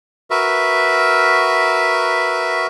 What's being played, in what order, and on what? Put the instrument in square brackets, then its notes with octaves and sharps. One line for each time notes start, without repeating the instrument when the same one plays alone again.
[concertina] F#4 A#4 B4 E5